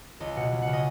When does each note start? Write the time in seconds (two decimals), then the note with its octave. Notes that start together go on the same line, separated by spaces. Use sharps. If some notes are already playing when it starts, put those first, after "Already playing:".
0.20 C#2 D#5
0.36 B2 F#5
0.52 C#2
0.62 F#5
0.67 C#3
0.73 D#5